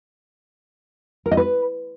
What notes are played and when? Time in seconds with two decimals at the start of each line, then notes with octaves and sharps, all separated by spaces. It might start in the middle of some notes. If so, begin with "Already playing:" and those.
1.26 A#4
1.31 D#5
1.37 B4